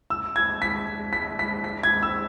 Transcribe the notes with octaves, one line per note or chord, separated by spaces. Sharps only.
E6
G#6
B6
B6
B6
B6
G#6
E6